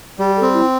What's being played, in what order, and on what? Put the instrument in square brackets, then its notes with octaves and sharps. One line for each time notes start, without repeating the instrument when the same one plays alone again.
[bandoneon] G3 [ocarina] G4
[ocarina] A4
[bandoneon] C4
[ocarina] E4